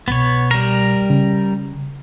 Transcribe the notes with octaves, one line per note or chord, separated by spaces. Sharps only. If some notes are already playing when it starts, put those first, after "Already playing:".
C2 B2 B3 C#5
G3 A#4
C#3